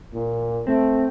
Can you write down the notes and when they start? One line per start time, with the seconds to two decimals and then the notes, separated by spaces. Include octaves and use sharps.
0.13 A#2
0.67 A3 C4